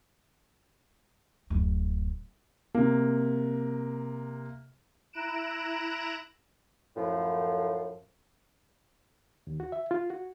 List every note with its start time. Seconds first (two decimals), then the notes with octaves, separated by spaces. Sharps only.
1.50 D1 F#2
2.74 C3 A#3
5.13 E4 A#5 F#6 D7 E7
6.96 F#2 A2 F3
9.47 D#2
9.60 F#4
9.72 E5
9.91 F4
10.10 F#4